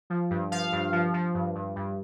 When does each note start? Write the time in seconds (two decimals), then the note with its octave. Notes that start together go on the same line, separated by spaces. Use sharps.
0.10 F3
0.30 G2
0.52 F3 F5
0.72 G2
0.93 F3
1.14 F3
1.35 G2
1.55 G2
1.76 G2